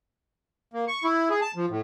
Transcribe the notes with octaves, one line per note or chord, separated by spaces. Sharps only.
A#3
C#6
E4
G#4
A5
F3
A2